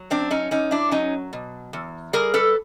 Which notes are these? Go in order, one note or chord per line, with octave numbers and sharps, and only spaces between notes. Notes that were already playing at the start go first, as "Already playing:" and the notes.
Already playing: F#3
F#2 C4 D4
C#4 D#4
F#2 C#4 D#4
D4 E4
F#3 C#4 D#4
B2
E2
G3 G#4 A#4
A4 B4